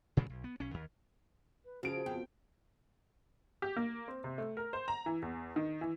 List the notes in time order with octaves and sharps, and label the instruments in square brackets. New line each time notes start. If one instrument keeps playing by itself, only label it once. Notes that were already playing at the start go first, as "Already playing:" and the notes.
[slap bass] A#2 C#3 E3 G#3
B1
B3
B1 C#4
D#2
[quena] B4
[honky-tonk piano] C#3 D7 [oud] F3 [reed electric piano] F4 F#4 [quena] G#4
[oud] F2 [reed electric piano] B3 F4 F#4 [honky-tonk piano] G5
[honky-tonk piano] G4
A#3
C4
C3
A3
A#4
C5
A#5
E3
E2
D#3
E3